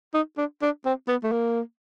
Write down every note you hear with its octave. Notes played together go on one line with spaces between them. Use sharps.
D#4
D4
D4
C4
B3
A3
A#3